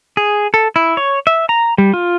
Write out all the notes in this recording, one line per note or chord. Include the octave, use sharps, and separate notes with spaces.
G#4
A4
E4
C#5
E5
A#5
G3
F4